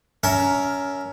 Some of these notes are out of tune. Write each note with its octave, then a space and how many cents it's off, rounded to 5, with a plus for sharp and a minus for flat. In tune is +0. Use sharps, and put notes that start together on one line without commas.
C#4 +20 A#4 +0 E5 +0